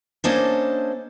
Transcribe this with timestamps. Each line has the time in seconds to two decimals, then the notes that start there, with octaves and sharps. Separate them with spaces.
0.24 A#3 C#4 D4 A4 C5 D#5